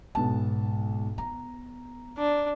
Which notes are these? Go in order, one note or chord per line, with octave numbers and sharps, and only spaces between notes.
B1 G#2 B3 A5
B3 A#5
D4